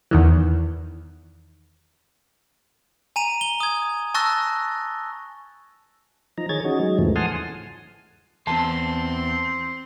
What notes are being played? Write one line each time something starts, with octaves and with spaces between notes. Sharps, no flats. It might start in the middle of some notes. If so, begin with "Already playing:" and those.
E2 D#3 E3
G#5 A#5 D#7 F7
G7
D#6 G#6
A5 C#6 E6 F#6 A6 A#6
F3 D#4 A#5
D#3 G#4 C#5 G#6 A6
C#4 D#4 F#4 G#4
F#3 G#3 D#4
E2 G#2 C#3 E3 F3 A3
F#5 G#5 A5 C6 D#6 F6
E2 C4 A5 C6